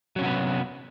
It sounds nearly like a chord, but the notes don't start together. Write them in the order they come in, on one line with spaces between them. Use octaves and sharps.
F#3 C#4 C3 F#4 B3